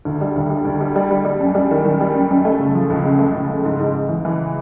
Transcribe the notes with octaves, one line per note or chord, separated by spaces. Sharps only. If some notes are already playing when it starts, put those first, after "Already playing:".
D2
G3
D2
G3
D2
G3
G3
G3
G3
F#2
G3
D#3
D#3
G3
F#2
F#2
A3
C#3
F3
C#2
C#3
A3
C#2
C#3
G#2
G#2
G#2
E3
E3